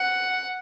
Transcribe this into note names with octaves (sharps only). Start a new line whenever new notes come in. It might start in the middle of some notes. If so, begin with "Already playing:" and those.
Already playing: F#5